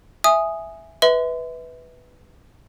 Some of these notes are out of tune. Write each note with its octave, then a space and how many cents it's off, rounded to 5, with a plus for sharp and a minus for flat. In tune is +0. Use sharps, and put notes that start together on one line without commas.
E5 +0 G#5 +0 D#6 +0
B4 +0 E5 -30 C6 -40